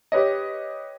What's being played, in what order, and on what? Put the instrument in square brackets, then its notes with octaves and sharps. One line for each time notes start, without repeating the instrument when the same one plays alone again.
[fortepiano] G4 B4 C#5 D#5